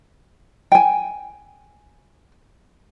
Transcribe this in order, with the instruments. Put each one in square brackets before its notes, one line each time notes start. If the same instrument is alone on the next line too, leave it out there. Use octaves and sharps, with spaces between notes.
[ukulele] G5 G#5